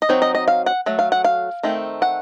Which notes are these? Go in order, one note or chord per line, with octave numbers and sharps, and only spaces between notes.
D#5
F#3 C4 D#4 C#5
D#5
D#5
F5
F#5
F#3 A3
F5
F#5
F5
D#3 A3 C4
F#5